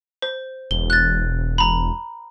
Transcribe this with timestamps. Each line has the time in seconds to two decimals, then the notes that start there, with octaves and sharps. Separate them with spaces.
0.22 C5
0.71 E1 G7
0.90 F#6 A6
1.58 A#5 B5